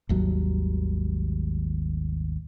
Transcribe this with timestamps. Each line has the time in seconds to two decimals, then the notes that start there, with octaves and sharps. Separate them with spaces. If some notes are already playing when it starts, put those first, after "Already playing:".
0.09 G#1 D#2 F#3 G3